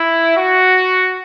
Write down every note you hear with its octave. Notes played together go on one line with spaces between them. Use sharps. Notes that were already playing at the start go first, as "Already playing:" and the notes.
Already playing: E4
F#4